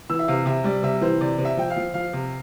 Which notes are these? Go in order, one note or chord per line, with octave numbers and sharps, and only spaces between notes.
E3 E6
E5
C3 F5
C3 E5
G3 D5
C3 E5
E3 C5
C3 D5
C3
E5
F3 G5
F5
F3
F3 F5
C3